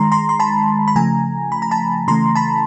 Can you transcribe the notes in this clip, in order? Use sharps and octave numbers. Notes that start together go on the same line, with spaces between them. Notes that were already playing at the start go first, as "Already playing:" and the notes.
Already playing: D#3 G#3 A#5 C6
A#5 C6
C6
A5 B5
B5
C#3 F3 A3 G#5 A#5
B5
A#5
A5 B5
C#3 E3 A3 A#5 C6
A5 B5